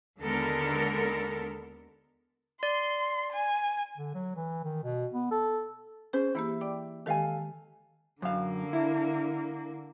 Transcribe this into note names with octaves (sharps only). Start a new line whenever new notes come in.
D#2 D3 G#3 B3 A4 A#4
D5 C6
G#5
D3
F#3
E3
D#3
B2
B3
A4
C#4 G#4 C5
E3 A#3 E4 G4
D5 G5 D6
D#3 G#3 G4 A4 F5 G#5
F#2 D3 A#3 F5
E4